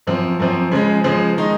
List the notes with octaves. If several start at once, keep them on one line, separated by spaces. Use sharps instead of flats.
F#2 F3 C4
F#2 F3 C4
C#3 F3 G#3
C#3 F3 G#3
D#3 G#3 D#4